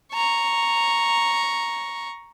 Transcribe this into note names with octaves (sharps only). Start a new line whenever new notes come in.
A#5 C#6